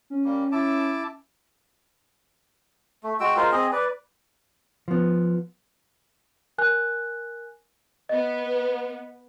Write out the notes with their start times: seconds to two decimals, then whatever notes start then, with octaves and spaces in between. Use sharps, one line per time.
0.10 C#4
0.25 G3 A#3
0.52 E4 A5 D6
3.03 A3
3.20 G#3 F#4 G5 E6
3.37 G#3 F4 A#4 C5
3.52 C4 G#4 D#5
3.72 B4 D5
4.88 F3 B3
6.58 A#4 G#5 F#6
8.09 B3 D#5